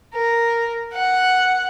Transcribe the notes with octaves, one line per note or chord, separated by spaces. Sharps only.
A#4
F#5